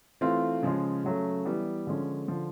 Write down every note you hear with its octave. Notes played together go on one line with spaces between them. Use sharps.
E3 A3 C4 F4
C#3 F3 G#3
C#3 F#3 A3
E3 G3 B3
D3 F3 G#3 C#4
D3 F3